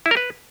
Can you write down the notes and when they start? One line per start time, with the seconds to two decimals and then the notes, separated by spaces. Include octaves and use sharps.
0.06 E4
0.11 A#4
0.17 B4